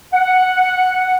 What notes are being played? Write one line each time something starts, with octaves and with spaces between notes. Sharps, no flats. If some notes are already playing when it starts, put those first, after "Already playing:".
F#5